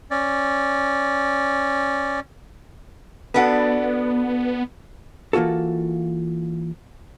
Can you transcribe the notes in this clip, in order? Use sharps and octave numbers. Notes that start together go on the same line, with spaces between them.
C#4 D5
B3 D4 F#4 A4 B4 F#5
E3 A#3 F4 F#4 A4